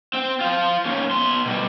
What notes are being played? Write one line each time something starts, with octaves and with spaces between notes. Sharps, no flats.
C4
F4 C5
D#2 C#4
B2 C6
B2 G3